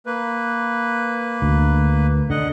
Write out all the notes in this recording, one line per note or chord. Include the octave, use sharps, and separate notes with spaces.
A#3 B4
D2
D3 D#5 F#5